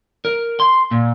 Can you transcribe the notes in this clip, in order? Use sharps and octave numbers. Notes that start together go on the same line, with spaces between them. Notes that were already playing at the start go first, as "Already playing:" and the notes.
A#4
C6
A#2